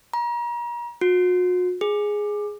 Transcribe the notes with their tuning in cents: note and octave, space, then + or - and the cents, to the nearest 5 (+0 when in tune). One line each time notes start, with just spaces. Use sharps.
A#5 +40
F#4 -40
G#4 +0